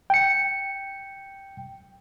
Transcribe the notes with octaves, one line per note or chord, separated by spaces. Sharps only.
G5 C#7